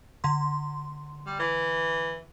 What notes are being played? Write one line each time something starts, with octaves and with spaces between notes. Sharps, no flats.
D3 C6
G3
E3